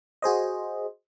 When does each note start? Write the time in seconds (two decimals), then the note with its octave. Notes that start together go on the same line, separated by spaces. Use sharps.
0.22 F#4 G#4 C5 D#5